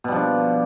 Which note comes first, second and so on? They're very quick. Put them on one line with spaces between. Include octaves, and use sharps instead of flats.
B2 G3 F3 D4